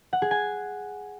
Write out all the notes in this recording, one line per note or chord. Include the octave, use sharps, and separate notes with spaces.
F#5
G#4
G#5